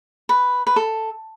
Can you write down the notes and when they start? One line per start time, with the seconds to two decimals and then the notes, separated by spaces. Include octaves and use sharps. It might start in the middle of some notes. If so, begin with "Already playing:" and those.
0.29 B4
0.67 B4
0.76 A4